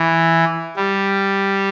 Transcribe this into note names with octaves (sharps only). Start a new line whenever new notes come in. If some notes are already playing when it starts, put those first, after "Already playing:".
Already playing: E3
G3